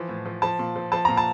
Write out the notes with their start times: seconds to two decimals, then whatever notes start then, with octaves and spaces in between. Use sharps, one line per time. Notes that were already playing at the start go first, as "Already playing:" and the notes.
Already playing: E3 F3
0.09 A2
0.26 F3
0.42 F3 A5
0.59 A#2
0.76 F3
0.92 F3 A5
1.05 A#2 A#5
1.17 A5